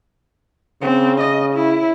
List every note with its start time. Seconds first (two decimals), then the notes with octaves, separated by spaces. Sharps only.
0.82 C#3 C4
1.21 D#5
1.54 E4